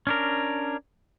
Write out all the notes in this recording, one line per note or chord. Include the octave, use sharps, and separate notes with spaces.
C#4 D4 A#4